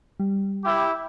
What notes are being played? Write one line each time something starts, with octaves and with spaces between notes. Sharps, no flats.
G3
E4 G4